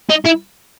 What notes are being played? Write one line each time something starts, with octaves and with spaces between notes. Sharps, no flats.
D#4
E4